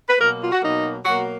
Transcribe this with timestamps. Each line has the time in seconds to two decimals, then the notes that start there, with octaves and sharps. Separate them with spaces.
0.09 B4
0.20 B2 F#3 A#3 A#4
0.41 F4
0.52 F#4
0.62 B2 F#3 A#3 D#4
1.05 B2 F#3 A#3 F#4